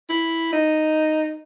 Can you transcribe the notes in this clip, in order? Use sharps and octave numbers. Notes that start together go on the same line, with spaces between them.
E4
D#4